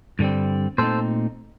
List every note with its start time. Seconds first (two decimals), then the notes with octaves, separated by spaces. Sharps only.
0.19 G2 D3 G3 C4
0.78 A#2 A3 C4 D#4 A4 C5